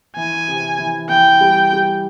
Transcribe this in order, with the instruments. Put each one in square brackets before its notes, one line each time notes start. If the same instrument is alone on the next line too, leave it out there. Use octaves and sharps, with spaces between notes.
[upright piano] E3 [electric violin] G#5
[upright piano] C3
E3
[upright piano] E3 [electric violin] G5
[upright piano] G3
G3